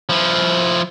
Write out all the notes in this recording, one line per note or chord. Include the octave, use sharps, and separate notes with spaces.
F3 E4